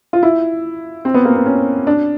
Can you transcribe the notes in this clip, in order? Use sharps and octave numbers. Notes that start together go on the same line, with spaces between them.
F4
E4
C4
B3
A#3
B3
C#4
D4